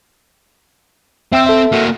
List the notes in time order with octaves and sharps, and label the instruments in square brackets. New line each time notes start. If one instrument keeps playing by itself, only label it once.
[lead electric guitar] C4 [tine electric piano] E5 G5 E6
[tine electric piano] A4 E5
[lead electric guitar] A#3 F#4